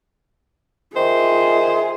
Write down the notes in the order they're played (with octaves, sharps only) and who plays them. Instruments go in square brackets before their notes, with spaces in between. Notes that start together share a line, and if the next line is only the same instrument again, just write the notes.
[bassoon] D#3 [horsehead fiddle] F4 G#4 [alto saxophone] C5 [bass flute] E5